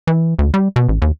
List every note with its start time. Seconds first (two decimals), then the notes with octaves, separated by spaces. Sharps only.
0.07 E3
0.39 D2
0.54 G3
0.76 B2
0.88 A1
1.02 D#2